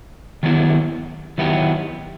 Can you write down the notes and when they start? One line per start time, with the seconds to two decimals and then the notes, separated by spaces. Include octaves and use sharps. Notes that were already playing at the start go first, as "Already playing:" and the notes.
0.43 D#3 F#3 B3 E4 G4
1.38 D#3 F#3 B3 E4 G4